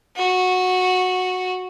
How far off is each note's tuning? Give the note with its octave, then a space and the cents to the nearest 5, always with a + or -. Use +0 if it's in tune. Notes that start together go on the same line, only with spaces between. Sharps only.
F#4 -10